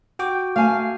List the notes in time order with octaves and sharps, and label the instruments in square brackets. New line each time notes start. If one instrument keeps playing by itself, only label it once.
[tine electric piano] F#4 G5 D6
[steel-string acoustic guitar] A3 G#5 [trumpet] F5